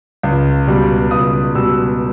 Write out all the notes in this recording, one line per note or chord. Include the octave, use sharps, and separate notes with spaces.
C#2
B2 G3
C#2 D#6
B2 G3 E6